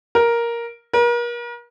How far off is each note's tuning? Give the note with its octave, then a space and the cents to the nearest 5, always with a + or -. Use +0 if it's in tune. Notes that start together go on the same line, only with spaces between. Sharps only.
A#4 +5
A#4 +40